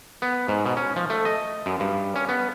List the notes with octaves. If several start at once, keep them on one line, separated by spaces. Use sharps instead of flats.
B3
G#2
B2
C#4
F3
A3
D#5
F#2
G2
C#4
B3